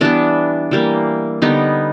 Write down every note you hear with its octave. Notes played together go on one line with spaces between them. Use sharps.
E3 G3 B3 D4
E3 G3 A#3
D3 G3 B3 D#4